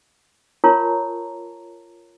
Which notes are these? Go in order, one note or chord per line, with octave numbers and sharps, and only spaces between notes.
F4 A#4 C#5 A5 A#5 C#6